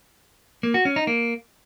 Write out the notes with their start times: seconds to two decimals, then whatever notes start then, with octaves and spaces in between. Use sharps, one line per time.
0.63 A#3
0.74 F#4
0.85 C#4
0.96 D#4
1.07 A#3